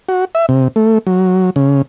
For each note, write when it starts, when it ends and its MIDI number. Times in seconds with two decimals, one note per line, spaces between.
0.09 0.25 66
0.35 0.46 76
0.49 0.68 48
0.76 0.98 57
1.07 1.50 54
1.56 1.82 49